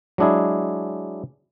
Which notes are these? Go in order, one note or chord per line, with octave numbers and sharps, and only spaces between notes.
F#3 G#3 D4 E4 G#4